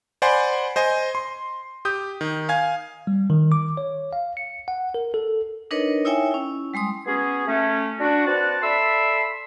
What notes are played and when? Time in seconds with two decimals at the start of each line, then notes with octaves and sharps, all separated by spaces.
0.22 C5 D5 F#5 G#5 B5 C6
0.76 C5 D#5 G#5
1.15 C6
1.85 G4 D#6 G6
2.21 D#3
2.49 F5 G#5 G#6
3.07 G3
3.30 D#3
3.52 D6
3.77 C#5
4.13 F5
4.37 C#7
4.68 F#5
4.94 A#4
5.14 A4
5.71 D4 D#4 A#4 B4 C#5 D#5
6.05 D#4 E4 C#5 E5 G5 G#5
6.31 C#4 E4
6.74 G3 G#3 C6 D#6
7.07 B3 C#4 F#4 G#4
7.47 A3 C#4
8.00 D4 F#4
8.26 C4 F#4 B4 D5 F#5 A5
8.63 A4 D5 E5 B5 C6 E6